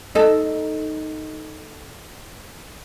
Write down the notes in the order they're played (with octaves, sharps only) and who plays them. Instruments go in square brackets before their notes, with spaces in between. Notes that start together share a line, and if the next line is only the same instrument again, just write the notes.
[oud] D#4 A4